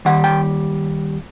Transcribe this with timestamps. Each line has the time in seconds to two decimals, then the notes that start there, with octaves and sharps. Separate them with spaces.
0.05 D#2 D#3 G3 F#5
0.24 G5